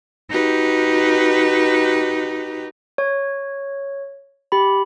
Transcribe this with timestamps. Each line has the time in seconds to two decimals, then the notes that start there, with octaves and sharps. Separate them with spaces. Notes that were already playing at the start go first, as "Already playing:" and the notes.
0.29 D#4 F#4 G4 B4
2.98 C#5
4.52 G4 B5